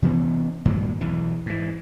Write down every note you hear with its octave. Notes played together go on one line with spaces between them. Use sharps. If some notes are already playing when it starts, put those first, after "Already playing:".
C3 E3 B3 C#4
G2 A#2 D#3 F#3
B1 E2 E3
G#2 E3